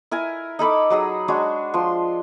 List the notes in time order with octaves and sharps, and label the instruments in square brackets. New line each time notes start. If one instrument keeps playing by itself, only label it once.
[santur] E4 A#4 G#5
D#4 A4 B5 D6
F#3 D#4 G#4 D#6
G#3 D4 F#4 C#5
F3 C6